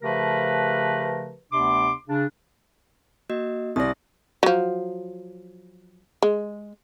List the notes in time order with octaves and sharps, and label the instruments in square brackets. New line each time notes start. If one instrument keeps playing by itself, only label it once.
[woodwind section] C#3 F3 A3 G4 A#4 B4
D2 C3 B3 D4 C6 D6
C#3 D4
[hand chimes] A#3 F#4 D#5
[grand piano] C2 D5 [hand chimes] D#6 A#6
[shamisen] F3 F#3
G#3